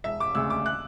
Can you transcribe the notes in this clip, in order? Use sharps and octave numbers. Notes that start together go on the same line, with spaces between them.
E1 E5
D6
D2 C#3 E6
D6
F#6